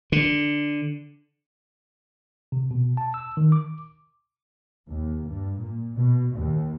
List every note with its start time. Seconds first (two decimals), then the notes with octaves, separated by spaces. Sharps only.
0.12 D3
2.52 C3
2.71 B2
2.97 A5
3.14 E6
3.37 D#3
3.52 D6
4.89 D#2
5.27 G2
5.58 A#2
5.96 B2
6.35 D#2